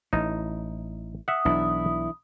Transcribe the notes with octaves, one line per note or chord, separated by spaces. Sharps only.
A1 D#4 E4
E5 F#5 D#6
B1 E3 D4 E4